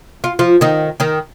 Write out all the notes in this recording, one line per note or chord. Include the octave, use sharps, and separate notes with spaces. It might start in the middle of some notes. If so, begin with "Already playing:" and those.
F4
F3 F4
D#3 D#4
D#3 D#4